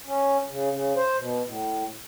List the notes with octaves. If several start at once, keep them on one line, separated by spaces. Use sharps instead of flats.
C#4
C#3
C#3
C5
B2
A2